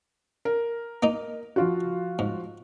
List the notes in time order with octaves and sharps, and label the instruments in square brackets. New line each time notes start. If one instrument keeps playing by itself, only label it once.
[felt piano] A#4
[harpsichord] A#3 D#4
[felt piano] F3 F4 F#4
[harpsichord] G#2